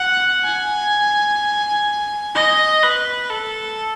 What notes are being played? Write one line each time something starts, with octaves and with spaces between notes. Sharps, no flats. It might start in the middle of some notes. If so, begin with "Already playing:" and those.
Already playing: F#5
G#5
D#5
B4
A4